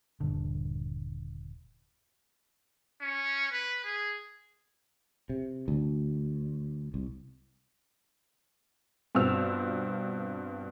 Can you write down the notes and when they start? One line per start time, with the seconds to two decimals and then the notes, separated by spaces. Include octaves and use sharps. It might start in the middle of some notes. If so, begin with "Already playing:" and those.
0.20 D#1 G2 D3
3.01 C#4
3.52 B4
3.85 G#4
5.29 C3
5.68 D2
6.94 C2
9.15 G2 B2 C4 F4 E6 F7